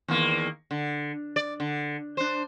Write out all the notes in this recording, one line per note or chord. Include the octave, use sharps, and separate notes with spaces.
E2 D#3 A#3
D3
D5
D3
D4 C5